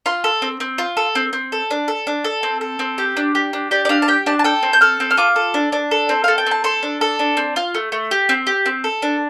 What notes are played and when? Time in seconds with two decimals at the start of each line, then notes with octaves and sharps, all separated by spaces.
0.06 F4 C6
0.24 A4
0.42 C4
0.60 C4
0.78 F4
0.97 A4
1.15 C4
1.33 C4
1.52 A4
1.71 D4
1.88 A4
2.07 D4
2.24 A4
2.43 C4
2.61 A4
2.79 C4
2.98 G4
3.17 D4
3.35 G4
3.53 D4
3.71 G4 D5
3.85 D5
3.89 D4 F5
4.02 A5
4.08 G4 G5
4.26 D4 A5
4.39 A5
4.44 A4 G5
4.63 C4
4.73 G6
4.81 A4 F6
5.00 C4
5.11 F6
5.17 F4 D6
5.36 A4
5.54 D4
5.72 D4
5.91 A4
6.09 C4
6.24 A4 F5
6.38 G5
6.46 C4 A5
6.64 A4 C6
6.83 D4
7.01 A4
7.19 D4
7.37 C4
7.56 F4
7.75 A3
7.92 A3
8.11 G4
8.29 C4
8.47 G4
8.66 C4
8.84 A4
9.02 D4